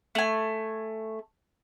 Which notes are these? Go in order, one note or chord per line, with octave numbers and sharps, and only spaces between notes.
A3 G#5